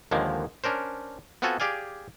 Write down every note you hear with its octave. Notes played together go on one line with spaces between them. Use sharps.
D#2 D3 D#3 F3 G#3 A#3
C#4 D4 A#4 C5
B3 C4 F4 F#4 A4 G#5
G4 G#4 D5 F5 G#5